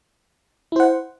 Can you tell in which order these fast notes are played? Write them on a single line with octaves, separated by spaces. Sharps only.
E4 C5 F#5